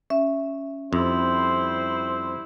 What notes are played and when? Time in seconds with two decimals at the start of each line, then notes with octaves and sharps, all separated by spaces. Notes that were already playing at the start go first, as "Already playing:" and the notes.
0.10 C#4 E5
0.93 F2 G3 E4 C5